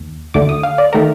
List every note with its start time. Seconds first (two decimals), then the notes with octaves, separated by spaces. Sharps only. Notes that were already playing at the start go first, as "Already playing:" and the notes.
Already playing: D#2
0.34 D2 D3 A3 D6
0.49 D#6
0.63 F5
0.78 D5
0.93 D#3 A3 A#4